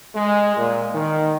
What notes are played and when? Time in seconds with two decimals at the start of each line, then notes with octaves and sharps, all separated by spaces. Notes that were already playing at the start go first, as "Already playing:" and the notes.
0.15 G#3
0.57 A#2
0.94 D#3